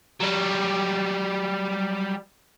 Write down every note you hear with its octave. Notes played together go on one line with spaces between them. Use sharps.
F#3 G3